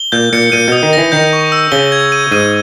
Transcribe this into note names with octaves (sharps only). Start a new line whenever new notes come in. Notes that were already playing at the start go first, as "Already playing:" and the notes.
Already playing: G7
A#2 G6
A#2 C#7
A#2 D#7
B2 D#6
D#3
A#6
E3
D#3 G6
C#6
E6
C#3 G7
G#6
D#7
G#2 D#7